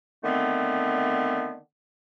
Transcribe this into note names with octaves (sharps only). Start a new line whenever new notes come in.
D3 D#3 A3 B3 C4